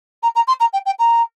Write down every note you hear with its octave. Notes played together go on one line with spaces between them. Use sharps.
A#5
A#5
C6
A#5
G5
G5
A#5